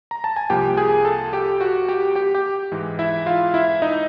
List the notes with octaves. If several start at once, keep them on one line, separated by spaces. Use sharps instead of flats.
A#5
A5
G#5
C2 C3 F3 A#3 G4 G5
G#4 G#5
A4 A5
G4 G5
F#4 F#5
G4 G5
G4 G5
G4 G5
G#2 E3 G#3
E4 E5
F4 F5
E4 E5
D#4 D#5